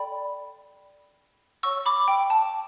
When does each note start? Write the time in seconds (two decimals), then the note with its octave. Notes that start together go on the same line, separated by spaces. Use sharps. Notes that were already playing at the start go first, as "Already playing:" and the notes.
Already playing: A4 D5 G5 B5
1.63 C#5 F#5 C#6 E6
1.86 B5 D6
2.08 G5
2.30 A5